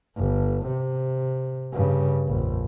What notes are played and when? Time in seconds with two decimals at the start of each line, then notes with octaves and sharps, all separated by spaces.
0.17 G1
0.67 C3
1.73 G2 C#3
2.27 A#1 F2